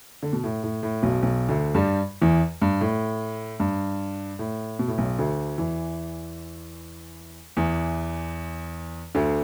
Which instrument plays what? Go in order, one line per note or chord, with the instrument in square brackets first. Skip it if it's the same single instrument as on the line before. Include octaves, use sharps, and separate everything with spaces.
[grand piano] D3
B2
A2
A2
A2
B1 B2
B1 B2
D2 D3
G2 G3
E2 E3
G2
A2
G2
A2
B2
A2
B1 B2
D2 D3
E2 E3
E2 E3
D2 D3